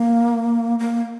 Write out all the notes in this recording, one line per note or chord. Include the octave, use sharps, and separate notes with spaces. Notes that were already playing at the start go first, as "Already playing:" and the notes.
Already playing: A#3
A#3